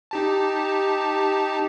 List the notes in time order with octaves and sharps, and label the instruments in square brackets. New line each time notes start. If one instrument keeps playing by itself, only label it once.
[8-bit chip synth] D#4 G4 A5